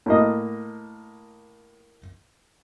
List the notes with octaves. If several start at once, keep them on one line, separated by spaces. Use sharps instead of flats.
A2 A#3 D#5